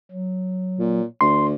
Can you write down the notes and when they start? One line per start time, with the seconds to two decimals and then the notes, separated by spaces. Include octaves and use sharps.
0.11 F#3
0.79 A#2
1.21 D2 C6